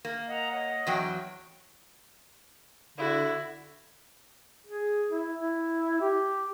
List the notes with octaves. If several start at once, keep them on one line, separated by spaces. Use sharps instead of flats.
A#3
D#5 F#5 A#5
C#5 D#5 F#5
E2 F#3 G5
D3 E4 F#4
G#4
E4
E4
G4